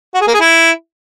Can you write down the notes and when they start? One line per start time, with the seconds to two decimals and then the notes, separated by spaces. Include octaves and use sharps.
0.14 F#4
0.21 G#4
0.27 A#3
0.34 G#4
0.40 E4